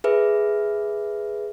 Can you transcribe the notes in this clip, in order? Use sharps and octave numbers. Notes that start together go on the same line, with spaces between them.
G#4 B4 E5